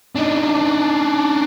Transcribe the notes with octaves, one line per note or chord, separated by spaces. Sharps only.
D4 D#4